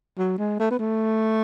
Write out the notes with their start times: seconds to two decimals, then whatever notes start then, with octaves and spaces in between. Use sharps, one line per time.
0.18 F#3
0.38 G#3
0.59 A3
0.71 B3
0.79 A3